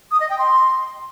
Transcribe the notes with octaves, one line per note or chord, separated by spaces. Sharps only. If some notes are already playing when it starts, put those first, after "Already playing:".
D#6
D#5
G5
C6